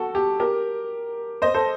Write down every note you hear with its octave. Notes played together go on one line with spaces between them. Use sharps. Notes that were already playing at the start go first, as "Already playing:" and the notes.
Already playing: F#4 A4
G4
G4 A#4
C5 D#5
A4 C5